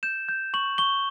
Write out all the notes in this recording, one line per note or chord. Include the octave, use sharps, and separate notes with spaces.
G6 E7
G6
C#6 F#7
C#6 G7